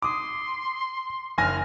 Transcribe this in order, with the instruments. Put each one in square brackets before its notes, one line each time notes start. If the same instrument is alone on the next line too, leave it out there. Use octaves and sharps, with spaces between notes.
[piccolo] C6 [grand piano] D6 D#6
[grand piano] F#1 G#5 A#6 [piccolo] F6